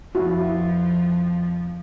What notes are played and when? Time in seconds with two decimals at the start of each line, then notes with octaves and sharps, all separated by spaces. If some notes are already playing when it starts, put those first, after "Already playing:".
0.15 F2 F3 E4 F#4